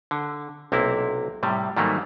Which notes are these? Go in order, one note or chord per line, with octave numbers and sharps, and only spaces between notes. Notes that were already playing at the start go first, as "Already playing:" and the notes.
D3
B1 C3 A#3 C4 E4
A2 C3 G3
G#2 D#3 F#3 G3 A3 A#3